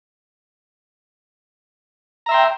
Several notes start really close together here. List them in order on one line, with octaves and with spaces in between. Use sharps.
A#5 E5 C6 G5